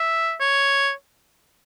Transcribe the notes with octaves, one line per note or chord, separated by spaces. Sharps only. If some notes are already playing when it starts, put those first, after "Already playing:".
Already playing: E5
C#5